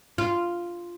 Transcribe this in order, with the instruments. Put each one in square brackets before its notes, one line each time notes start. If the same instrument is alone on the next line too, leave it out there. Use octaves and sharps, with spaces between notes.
[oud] F4